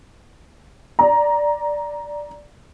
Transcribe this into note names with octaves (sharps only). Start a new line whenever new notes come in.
D5 A#5